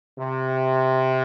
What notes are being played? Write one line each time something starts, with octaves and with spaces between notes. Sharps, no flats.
C3